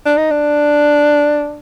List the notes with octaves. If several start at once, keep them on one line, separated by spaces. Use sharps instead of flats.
D4
D#4
D4